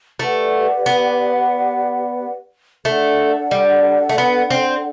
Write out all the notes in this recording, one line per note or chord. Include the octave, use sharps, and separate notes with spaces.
A3 G4 B4 D5 F#5
B3
A3 D4 A4 D5 F#5
G3
A3
B3
C4